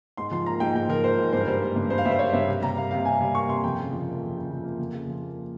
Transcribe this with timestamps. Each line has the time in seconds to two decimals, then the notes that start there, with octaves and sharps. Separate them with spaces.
0.17 G#2 C6
0.31 F3 C6
0.46 A#3 A#5
0.60 G#2 G5
0.75 G#2 G5
0.89 F3 A#4
1.04 A#3 C5
1.18 G#2
1.33 G2 C5
1.40 A#4
1.47 G3 C5
1.62 A#3
1.76 G2
1.90 G2 C5
1.98 F5
2.05 G3 E5
2.12 C5
2.19 A#3 C#5
2.33 G2 E5
2.48 C3
2.62 G3 A#5
2.76 A#3 F5
2.91 C3 F5
3.05 C3 G#5
3.21 G3
3.35 A#3 C#6
3.49 C3 C6
3.64 F2 G5
3.78 C#3
3.92 F3
4.07 A#3
4.22 F2
4.35 C#3
4.50 F3
4.64 A#3
4.80 F2
4.93 C#3
5.07 F3
5.22 A#3